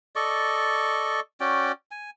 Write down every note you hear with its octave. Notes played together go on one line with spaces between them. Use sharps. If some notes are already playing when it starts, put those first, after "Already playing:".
A4 D5 D#5 C#6
C#4 F#4 D5 G5
G#5